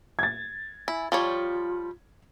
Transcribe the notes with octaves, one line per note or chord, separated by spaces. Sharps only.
G#6 A6
E4 G#5
F3 G3 F4 C#5